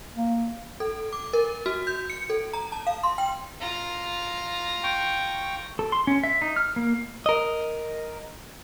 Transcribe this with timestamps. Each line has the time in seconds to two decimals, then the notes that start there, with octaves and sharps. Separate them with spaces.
0.16 A#3
0.80 A4
1.13 D6
1.33 A#4
1.66 F#4
1.87 G6
2.10 C#7
2.30 A4
2.53 A#5
2.72 A5
2.87 F5
3.03 C6
3.18 G5
3.61 F4 A#5
4.83 G5 C#6
5.79 A4
5.92 C6
6.07 C#4
6.24 E5
6.42 D#4
6.56 F6
6.76 A#3
7.26 A#4 D#5